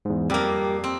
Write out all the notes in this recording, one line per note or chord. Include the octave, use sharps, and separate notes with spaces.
E2 G#2
F2 G3 A#3 G4 A#4
C4